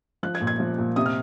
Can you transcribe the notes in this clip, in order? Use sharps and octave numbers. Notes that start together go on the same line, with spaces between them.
F3 F#6
G#6
A#2
G#6
F3
A#2
C3 D#6
F6